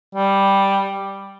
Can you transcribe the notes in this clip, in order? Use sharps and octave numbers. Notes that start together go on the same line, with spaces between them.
G3